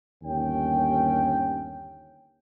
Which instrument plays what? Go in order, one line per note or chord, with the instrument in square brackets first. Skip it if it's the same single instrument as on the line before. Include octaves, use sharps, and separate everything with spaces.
[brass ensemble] G1 D#2 C#4 G5